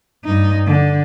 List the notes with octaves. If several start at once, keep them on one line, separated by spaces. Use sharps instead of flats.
G2 D#4
D3